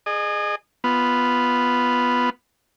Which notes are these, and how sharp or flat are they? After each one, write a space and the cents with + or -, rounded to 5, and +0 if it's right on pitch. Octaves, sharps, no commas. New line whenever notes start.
G#4 +0 D#5 -35
B3 +0 F4 +0